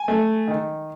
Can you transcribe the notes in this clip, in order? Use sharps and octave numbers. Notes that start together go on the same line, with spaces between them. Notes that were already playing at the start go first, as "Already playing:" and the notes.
Already playing: G#5
A3
D#3